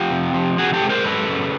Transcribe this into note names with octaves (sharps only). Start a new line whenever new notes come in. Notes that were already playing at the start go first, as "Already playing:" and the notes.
Already playing: F3 F4 G4
C3
F3
C3 F#4 G#4
G4 A4
G#3
A#4 C5
F#2 A4 B4
C#3